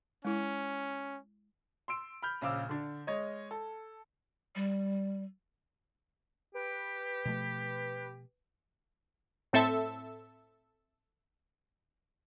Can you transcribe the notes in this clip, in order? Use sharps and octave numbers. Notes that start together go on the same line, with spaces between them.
G#3 C#4 E4
C6 E6 D7
B5 F6 G6
A#1 C#3 F5 D6 E6
D3 D4
G#3 C#5 D#5
A4
G3
G4 B4
B2 F3 A3
A2 C4 A4 E5 A5 E6